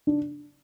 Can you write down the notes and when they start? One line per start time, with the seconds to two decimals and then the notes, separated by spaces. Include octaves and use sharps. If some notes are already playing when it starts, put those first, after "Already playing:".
0.07 D4